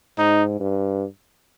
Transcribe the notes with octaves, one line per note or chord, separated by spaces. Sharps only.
G#2 D#4
G2